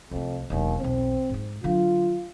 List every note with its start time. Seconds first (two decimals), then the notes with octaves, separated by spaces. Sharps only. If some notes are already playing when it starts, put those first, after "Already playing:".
0.11 C2 F2 A3
0.50 E1 D#2 F#3
0.80 B1 E2 C4
1.30 G#2 D#4
1.64 D3 F#3 F4